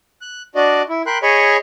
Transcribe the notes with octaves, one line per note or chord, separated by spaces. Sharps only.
F#6
D4 F#4 D5 D#5
E4
A#4 G5 B5 C6 F#6
G#4 C#5 D#5 B5 C#6